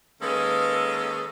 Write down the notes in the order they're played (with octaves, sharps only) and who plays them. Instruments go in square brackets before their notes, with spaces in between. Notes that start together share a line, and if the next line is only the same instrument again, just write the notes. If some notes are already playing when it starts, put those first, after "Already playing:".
[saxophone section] D#3 G#3 A#3 C#4 A4 B4